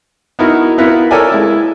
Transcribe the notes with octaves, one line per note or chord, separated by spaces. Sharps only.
B3 D#4 E4 F#4 A#4
B3 E4 F4 A#4 B4
A4 A#4 C#5 D5 G5 G#5
G#3 E4 E6